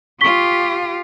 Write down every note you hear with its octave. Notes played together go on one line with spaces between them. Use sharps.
F4 G4 C#6 B6 G7